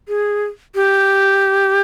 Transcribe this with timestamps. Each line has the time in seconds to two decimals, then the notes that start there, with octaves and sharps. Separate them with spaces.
0.08 G#4
0.75 G4